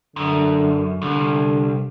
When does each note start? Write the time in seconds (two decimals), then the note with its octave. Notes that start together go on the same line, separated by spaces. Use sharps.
0.16 F#2 D3
1.02 C2 D3